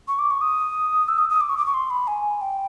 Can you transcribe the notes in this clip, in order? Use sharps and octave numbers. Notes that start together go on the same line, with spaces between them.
C#6
D6
C#6
D#6
E6
D#6
D#6
D6
C#6
D6
C#6
C6
B5
G#5
G5